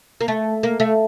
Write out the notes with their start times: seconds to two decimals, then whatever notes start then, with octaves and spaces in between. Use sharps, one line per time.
0.21 A#3
0.28 A3
0.63 A#3
0.80 A3